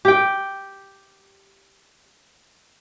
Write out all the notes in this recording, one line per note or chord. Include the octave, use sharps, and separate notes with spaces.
G4 G5